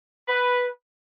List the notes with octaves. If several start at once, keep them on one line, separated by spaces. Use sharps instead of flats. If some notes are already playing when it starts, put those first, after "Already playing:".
B4